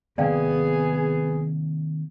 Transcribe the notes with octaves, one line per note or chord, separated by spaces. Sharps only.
C3 D#3 A#3 B3 G#4 D5 F5 G5